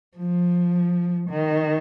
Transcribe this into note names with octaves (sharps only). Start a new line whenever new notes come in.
F3
D#3